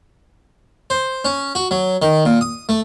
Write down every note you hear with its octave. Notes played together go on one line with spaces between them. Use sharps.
C5
C#4
F#4
F#3
D#3
A#2
D#6
A3